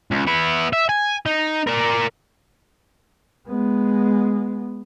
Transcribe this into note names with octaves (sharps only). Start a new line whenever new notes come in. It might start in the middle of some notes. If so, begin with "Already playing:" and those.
C#2
B3 E4
E5
G#5
D#4
A#4 D5
G#3 B3